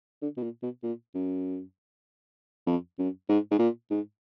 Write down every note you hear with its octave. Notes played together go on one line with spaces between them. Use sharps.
D3
B2
A#2
B2
A#2
F#2
F2
F#2
G#2
G#2
A#2
G#2